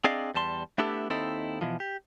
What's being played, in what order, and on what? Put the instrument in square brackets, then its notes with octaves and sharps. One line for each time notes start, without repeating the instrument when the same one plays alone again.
[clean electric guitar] C4 D4 G#4 D5 D#5 F5
E2 G3 A5 C6
A3 B3 D4 E4 G4 A4
D#2 C4 D#4 E4 A4
B2 E3 F3
G4